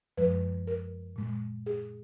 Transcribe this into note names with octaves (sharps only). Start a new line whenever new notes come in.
F#2 F3 G#3 B4
A#4
A#2 G#3
G#4